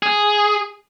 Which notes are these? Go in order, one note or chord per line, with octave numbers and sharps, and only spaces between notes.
G#4